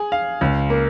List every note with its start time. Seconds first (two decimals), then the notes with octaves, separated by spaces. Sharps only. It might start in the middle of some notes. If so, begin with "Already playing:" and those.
Already playing: G#4
0.12 F5
0.41 C#2
0.70 A#3